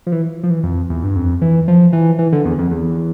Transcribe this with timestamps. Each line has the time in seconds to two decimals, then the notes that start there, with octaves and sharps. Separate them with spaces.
0.07 F3
0.12 E3
0.43 F3
0.50 E3
0.64 F2
0.90 E2
1.04 G2
1.16 F2
1.42 E3
1.68 F3
1.93 E3
2.19 E3
2.33 D3
2.45 E2
2.59 F2
2.71 E2